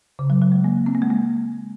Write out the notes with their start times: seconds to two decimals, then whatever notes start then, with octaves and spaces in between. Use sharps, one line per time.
0.19 C#3
0.30 F#3
0.42 F#3
0.52 G#3
0.64 A#3
0.86 C4
0.95 A#3
1.02 G#3
1.10 A#3